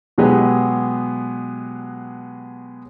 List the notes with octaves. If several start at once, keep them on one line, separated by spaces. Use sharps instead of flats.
B2 F#3 G#3 B3 G4 G#4